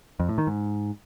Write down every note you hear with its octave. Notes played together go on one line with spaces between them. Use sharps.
F2
A2
D#3
G#2